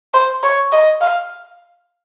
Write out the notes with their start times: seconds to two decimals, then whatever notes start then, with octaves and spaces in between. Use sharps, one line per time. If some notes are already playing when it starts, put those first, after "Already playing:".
0.14 C5
0.43 C#5
0.72 D#5
1.01 F5